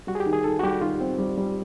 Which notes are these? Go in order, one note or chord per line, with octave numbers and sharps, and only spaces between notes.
G3 F#4
G#4
G4
D#3
G#4
D#3 A4
F#4
G3 G4
D#3 F4
C4
G3
G3